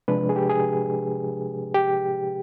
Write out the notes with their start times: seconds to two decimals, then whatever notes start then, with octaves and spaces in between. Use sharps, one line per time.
0.08 C3 F3 G#3 D4 B4
0.29 G#4
0.36 G4
0.50 G#4
1.74 G4